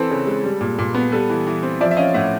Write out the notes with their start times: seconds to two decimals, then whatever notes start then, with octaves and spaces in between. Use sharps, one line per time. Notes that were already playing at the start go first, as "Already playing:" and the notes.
Already playing: E3 C4 A4 B4
0.10 C#3
0.27 G#3
0.44 G3
0.61 A#2
0.79 A#2
0.95 B3
1.12 G3 A4 B4
1.30 E3
1.47 E3
1.63 C4
1.80 F3 D5 E5
1.91 E5
1.97 C#4 D#5 F5
2.14 A2 E5 F#5